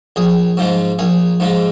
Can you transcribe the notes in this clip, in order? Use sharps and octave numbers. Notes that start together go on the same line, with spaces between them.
A#1 G#4
G#2 F3 G#3
A#1 G#4
G#2 F3 G#3